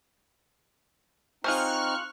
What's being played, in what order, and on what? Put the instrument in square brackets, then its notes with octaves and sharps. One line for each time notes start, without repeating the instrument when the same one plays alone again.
[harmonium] C4 D#4 [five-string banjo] F4 G#4 C5 [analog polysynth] C#6 F6 F#6